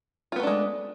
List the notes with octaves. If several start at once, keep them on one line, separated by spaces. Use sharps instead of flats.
G#3 A3 B3 D4 F4